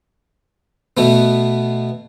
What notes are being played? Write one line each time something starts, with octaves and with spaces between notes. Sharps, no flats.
B2 A3 B3